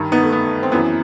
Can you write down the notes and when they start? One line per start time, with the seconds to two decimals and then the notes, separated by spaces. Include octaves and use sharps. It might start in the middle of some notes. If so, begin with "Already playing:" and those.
Already playing: G2 D#3
0.12 B3 D#4
0.23 A3
0.32 B3
0.63 C4
0.72 F#2 E3 B3